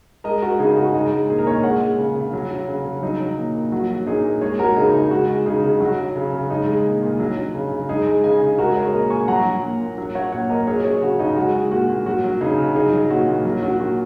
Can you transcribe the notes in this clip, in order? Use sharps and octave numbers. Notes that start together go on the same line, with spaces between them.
G#3 A#4 D#5
G#3 F#4 A#4
C#3 D#4 G#4
C#3 F#4
G#3 D#4
G#3
A#2 G#4
A#4
A#2 C#5
D#5
G#3 C#5 F#5
G#3
C#3
C#3
F#3
F#3
C#3
C#3
F#3 D#4
F#3
A#2
A#2
F#3 F#4
F#3
A#2 D#4 G#4
A#2
G#3 G#4 C#5
G#3 F#4 A#4
C#3 D#4 G#4
C#3 D#4
G#3 F#4
G#3
C#3 D#4 G#4
C#3
F#3 F#4
F#3
C#3
C#3
G#3 D#4
G#3
A#2
A#2
F#3
F#3
C#3
C#3
G#3 D#4 G#4
G#3
C#3 D#5 G#5
C#3
G#3 F#4 A#4
G#3 G#4 C#5
A#2 A#4 D#5
A#2 G#5 C#6
F#3 F#5 A#5
F#3
A#2
A#2
F#3
F#3 C#5 F#5
A#2 C#5 F#5
A#2 A#4 D#5
F#3 G#4 C#5
F#3 G#4 C#5
C#3 F#4
C#3 D#4
G#3 F#4
G#3
A#2 F#4
A#2
F#3 F#4
F#3
C#3 D#4 G#4
C#3
F#3 D#4 G#4
F#3
A#2 F#4
A#2
F#3
F#3 F#4
A#2 F#4